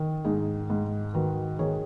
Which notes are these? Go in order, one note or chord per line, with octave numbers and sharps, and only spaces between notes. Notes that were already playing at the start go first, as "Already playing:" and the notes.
Already playing: D#3
G#2 D#4 G#4
G#2
D#3 F#4 B4
D#3 G#4 C#5